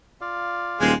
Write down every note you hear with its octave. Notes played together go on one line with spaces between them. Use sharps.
F4 D5 F5
D#1 G#3 C4 G#4